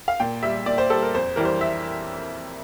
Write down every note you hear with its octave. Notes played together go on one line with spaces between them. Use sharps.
F5
A#2 G5
G3 E5
A#2 D5
C5
G3 A4
A#4
F2 C5
E3 G3 A#4
C5
E5